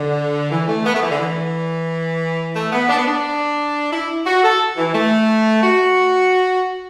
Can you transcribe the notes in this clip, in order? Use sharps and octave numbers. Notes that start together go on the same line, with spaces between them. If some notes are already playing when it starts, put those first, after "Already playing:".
Already playing: D3
E3
A3
B3
A3
E3
D3
E3
A3
B3
D4
B3
D4
E4
F#4
A4
E3
A3
F#4